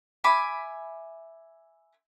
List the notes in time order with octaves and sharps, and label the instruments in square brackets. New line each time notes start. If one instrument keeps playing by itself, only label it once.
[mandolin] E5 G#5 B5 D6